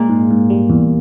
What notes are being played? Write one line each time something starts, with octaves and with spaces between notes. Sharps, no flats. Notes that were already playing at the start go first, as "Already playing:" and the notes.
Already playing: A#2 G#3 A#3
G#2
G#2
G3
E2